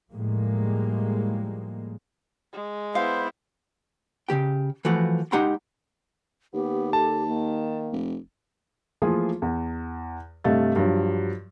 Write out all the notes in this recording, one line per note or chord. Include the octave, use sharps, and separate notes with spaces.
A2 F3 G3 G#3 A#3
G#3
B3 E4 C5 F5
C#3 F3 G4 G5
E3 F3 A3 F#4
G#3 D#4 G4 F#5 A#5 C6
D#2 B3 G4
A4 A5
D#3 A#3
F1
E3 F3 A3 A#3 F4 G#4
E2
G2 C3 A3 D#5 F5 A6
G2 F3 F#3